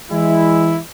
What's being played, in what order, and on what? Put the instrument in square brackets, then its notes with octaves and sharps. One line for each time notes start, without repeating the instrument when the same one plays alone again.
[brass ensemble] E3 G#3 E4